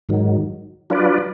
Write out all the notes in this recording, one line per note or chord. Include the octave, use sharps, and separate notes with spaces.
G#2 D#3 F#3
F#3 D4 F4 B4 D5